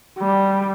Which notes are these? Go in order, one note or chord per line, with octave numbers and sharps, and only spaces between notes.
G3